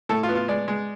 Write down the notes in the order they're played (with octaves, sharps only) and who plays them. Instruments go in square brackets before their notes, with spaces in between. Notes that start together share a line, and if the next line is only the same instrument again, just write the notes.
[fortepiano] A2 A4
F4
B3
F4
G#3 D5
G#3